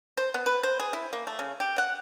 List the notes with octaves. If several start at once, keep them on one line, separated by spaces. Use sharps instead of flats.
C5
B3
B4
C5
G#4
E4
A#3
A3
C#3
G4
F#5